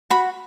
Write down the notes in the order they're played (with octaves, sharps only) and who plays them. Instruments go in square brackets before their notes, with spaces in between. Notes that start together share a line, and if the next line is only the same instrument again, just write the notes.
[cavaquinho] F#4 B5